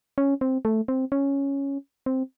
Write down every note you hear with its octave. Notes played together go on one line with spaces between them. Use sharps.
C#4
C4
A3
C4
C#4
C4